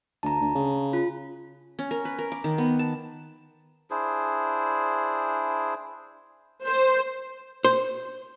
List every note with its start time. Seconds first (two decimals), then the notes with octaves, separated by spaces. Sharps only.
0.23 D2 A5 A#5
0.41 D2
0.55 C#3
0.93 F4
1.79 C#4
1.91 A#4
2.05 B4
2.19 A#4
2.32 D6
2.44 D#3
2.58 B3
2.79 A5
3.90 D4 E4 G#4 C5
6.65 C5
7.65 C5